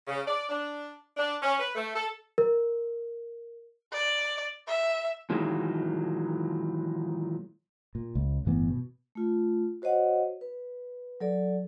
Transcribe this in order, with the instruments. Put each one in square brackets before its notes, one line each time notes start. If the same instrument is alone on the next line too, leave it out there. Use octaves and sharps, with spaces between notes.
[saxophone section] C#3
D5
D4
D4
C#4
B4
A3
A4
[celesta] A#4
[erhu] D5
E5
[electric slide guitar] A#2 D#3 E3 F#3 G#3
[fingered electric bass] A#2
C#2
G1 A2 E3 B3
B2
[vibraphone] A3 F4
F#4 C5 C#5 D#5 F#5
B4
F#3 A4 D5